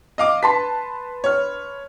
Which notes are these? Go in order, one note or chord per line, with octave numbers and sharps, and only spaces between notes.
D#5 F5 D6
B4 A5 C6 B6
C#5 F6